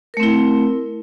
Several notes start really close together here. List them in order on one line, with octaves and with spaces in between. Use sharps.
A#4 A3 C4 E4